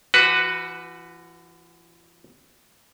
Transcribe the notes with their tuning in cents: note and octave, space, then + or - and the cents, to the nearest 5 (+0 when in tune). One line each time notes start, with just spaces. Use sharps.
E3 +40 F#4 +0 B4 +0